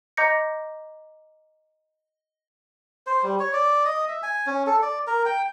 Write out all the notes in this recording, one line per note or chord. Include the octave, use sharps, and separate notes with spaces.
D#5 A#5 D6 G6 A#6 C#7
C5
G3
C#5
D5
D#5
E5
G#5
C#4
A4
D5
A#4
G5